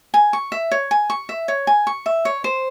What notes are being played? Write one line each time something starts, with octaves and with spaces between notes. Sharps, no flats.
G#5
C#6
E5
C#5
G#5
C#6
E5
C#5
G#5
C#6
E5
C#5
C5